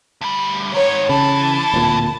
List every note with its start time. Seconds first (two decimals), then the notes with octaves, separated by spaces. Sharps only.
0.21 D2 G3
0.75 G#2 D#3 C#5
1.09 C#3 E3 A5
1.73 D1 A#2